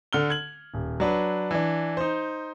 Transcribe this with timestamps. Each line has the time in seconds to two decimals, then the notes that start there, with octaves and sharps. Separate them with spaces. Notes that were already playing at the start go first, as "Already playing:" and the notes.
0.13 D3 F6 G7
0.30 G#6 F#7
0.74 D#1
1.00 F#3 D4 B4
1.51 E3 D4
1.97 D#4 C5